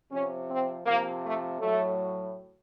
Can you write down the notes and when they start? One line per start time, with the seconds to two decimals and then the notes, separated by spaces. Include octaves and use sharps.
0.11 C3 F3 C#4
0.49 C4
0.85 C3 F3 A#3
1.23 A3
1.60 A2 F#3 A3